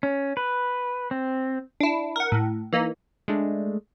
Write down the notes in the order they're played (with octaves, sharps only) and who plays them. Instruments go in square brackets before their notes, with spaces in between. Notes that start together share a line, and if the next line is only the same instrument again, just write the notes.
[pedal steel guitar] C#4
B4
C4
[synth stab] D4 E4
A#4 F#5
A2
E3 A#3 D#4
[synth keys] G#3 A3 D4